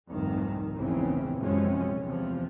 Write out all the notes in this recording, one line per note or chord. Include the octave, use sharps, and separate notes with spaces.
F1 C2 G#2 D#3
F1 A#1 E2 C#3 E3 C4
A#1 F#2 C3 F3 G#3 C#4
E2 C3 F3